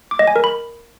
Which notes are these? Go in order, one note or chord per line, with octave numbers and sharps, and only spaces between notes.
D6
D#5
G#5
A#4
B5